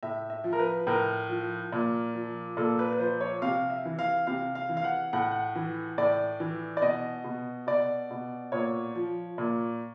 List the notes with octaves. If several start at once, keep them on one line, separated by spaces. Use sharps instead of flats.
A2 E5
E5
F3
A#4
B4
A2 A#4
F3
A#2
F3
A#2 A4
B4
B4
F3 C5
C#5
C3 F5
E5
E3
F5
C3 F5
F5
E3
F5
F#5
A2 F#5
F#5
E3
A2 D5
E3
D5
B2 D#5
B2
B2 D5
B2
A#2 C#5
F3
A#2